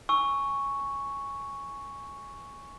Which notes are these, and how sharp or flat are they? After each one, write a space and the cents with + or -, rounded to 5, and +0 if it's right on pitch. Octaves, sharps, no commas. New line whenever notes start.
G#5 +0 C#6 +0 E6 +0